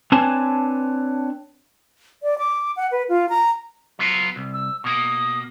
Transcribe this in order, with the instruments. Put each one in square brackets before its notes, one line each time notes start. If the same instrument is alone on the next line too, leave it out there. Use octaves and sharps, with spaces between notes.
[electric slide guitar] C4 D4 B4 C#5 G#5 A5
[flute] D5
D6
F#5
B4
F4
A#5
[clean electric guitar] F#3 B3 F4
C2
[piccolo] E6
[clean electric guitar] B2 A#3 [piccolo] D#6